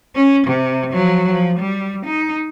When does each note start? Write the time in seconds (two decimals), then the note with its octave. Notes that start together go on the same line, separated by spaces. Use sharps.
0.16 C#4
0.47 C3
0.93 F3 F#3
1.29 F3
1.59 G3
2.06 D#4